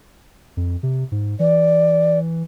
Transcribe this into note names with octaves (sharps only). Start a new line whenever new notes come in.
F2
C3
G#2
E3 D5